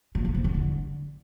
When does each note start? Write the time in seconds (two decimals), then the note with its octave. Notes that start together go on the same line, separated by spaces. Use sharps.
0.15 A#2
0.25 E2
0.35 C3
0.44 E2
0.54 D3